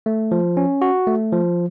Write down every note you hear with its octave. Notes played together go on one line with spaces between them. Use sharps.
A3
F3
C#4
F#4
A3
F3